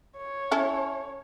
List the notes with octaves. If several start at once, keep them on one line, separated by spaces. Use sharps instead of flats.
C#5
C#4 E4 A4